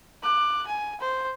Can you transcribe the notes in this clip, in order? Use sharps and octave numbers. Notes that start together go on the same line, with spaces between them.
D6 F#6
G#5
C5